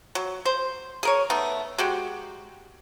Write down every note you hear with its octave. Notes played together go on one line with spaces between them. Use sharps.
F#3
C5
G#4 A#4 C#5
A3 B3 D#4
G#3 F#4 G4